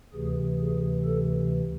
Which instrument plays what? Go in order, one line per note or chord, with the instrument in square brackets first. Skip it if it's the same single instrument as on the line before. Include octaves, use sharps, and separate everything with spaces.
[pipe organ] D2 C3 E3 G#4
G#4
A4